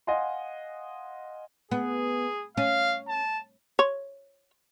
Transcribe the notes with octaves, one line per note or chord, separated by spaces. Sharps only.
D#5 F5 F#5 G#5 C6
B3 G#4
C#4 F5
A5
C#5